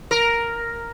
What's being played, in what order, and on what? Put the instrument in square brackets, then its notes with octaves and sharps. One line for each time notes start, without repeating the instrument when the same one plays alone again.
[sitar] A#4